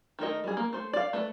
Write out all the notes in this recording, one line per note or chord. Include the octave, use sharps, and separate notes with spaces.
D#3 A3 A#4 D#5
G3 G#4
A#3
A3 C5
D5 F5
A3 B4 D5